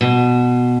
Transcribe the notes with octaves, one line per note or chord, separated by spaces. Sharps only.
B2